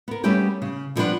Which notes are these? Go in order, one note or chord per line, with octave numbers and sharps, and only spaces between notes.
B3 A#4
G3 A3 B3 C#4 G4 G#4
C#3
D3 F3 G3 B3 D4 F#5